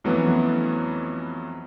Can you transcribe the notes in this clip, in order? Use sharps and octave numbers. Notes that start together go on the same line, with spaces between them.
F2 E3 F#3 A3 B3 C#4